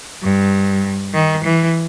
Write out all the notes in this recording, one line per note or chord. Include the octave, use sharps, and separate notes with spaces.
G2
D#3
E3